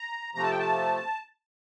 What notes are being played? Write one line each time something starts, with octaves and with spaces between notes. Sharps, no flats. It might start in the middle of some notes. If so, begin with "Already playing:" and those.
Already playing: A#5
C3 F3 A3 A#5
A5
G5
A5